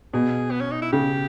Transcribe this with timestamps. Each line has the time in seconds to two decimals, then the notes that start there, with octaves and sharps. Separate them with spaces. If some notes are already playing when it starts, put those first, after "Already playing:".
0.14 B2 G#4
0.51 B3
0.61 C#4
0.72 D#4
0.82 E4
0.93 C#3 G4